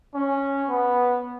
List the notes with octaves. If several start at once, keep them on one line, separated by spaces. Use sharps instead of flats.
C#4
B3